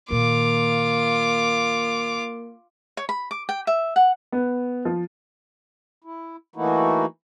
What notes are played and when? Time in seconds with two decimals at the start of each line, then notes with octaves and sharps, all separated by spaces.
0.10 A#2 D#3 A#3 F4 D6
2.97 C#5
3.09 B5
3.31 D6
3.49 G5
3.67 E5
3.96 F#5
4.32 B3
4.85 F3
6.04 E4
6.56 E3 A3 A#3 D#4 E4 F#4